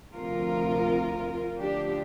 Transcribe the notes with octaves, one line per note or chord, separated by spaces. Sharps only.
D2 C3 F3 F4 A#4
D2 D3 F3 D4 G4